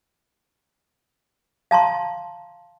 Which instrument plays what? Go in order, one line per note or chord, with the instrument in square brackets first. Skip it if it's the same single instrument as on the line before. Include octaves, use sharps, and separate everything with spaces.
[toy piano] F5 A5 A#5 C6